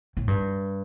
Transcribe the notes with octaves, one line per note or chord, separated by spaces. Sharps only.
A2
G2